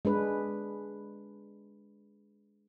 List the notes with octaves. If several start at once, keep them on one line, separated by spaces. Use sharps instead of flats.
G#3 D4 B4